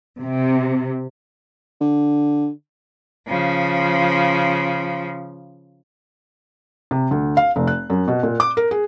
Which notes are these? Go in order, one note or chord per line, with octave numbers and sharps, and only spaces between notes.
C3
D3
C#3 F3
C3
D2
F5
F1
F#6
F#2
B2
A#2
D6
A#4
G#4